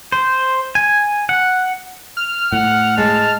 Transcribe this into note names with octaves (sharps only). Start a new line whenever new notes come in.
C5
G#5
F#5
F6
A2 F#5
G#3 A5